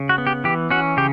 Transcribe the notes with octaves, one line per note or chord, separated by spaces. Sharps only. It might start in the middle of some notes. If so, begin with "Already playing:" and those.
Already playing: C#3
F#4
B3
G4
E3 G4
C#4 F#4
C#3 G4